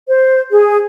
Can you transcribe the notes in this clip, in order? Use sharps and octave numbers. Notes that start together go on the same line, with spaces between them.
C5
G#4